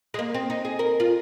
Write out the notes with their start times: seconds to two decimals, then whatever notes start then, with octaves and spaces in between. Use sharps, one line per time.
0.14 G#3
0.19 A#3
0.34 C4
0.50 D#4
0.65 G#4
0.79 A#4
1.00 F4